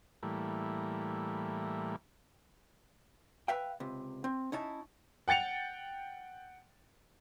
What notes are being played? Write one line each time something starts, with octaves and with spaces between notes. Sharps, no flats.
A2 E3 G3 A#3
B4 E5 F5 G5
C#2 C3
C4
C#4 D#4 E4 A5
F#5 G5 A6 C#7 F7